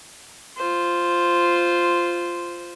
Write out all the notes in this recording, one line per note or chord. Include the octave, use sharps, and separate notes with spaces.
F4 C5